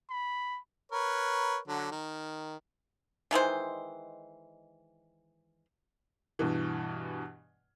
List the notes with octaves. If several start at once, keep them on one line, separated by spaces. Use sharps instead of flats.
B5
A#4 B4 C#5
D3 F#3
D#3
D#3 E3 G#3 C5
G2 B2 E3